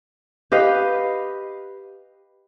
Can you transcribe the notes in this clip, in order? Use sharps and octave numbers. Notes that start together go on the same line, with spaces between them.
G4 B4 D#5 F5